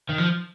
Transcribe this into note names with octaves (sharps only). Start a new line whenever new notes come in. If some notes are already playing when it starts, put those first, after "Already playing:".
D#3
F3